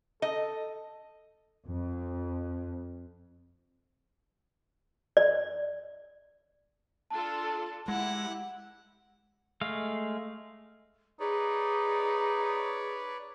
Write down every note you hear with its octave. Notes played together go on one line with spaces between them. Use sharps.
A4 D#5
F2
D5
D4 F4 A4 A5
G#3 E4 G4 F#5
G#3 A3 F5
D#4 G#4 B4 C#5 D5